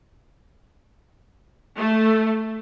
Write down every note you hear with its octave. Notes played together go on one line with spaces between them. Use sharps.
A3